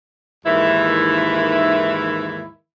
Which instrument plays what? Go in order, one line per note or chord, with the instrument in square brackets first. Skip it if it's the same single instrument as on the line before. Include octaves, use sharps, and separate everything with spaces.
[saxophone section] D#2 G#2 D#3 E3 E4 E5